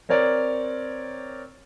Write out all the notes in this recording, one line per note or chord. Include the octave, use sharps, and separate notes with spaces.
C4 A#4 C#5 D5